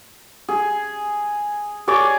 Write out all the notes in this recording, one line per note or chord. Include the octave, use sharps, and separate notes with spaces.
G#4
G#4 C#5 D5 D6